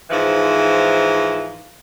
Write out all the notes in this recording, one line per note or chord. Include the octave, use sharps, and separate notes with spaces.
G#2 E3 F3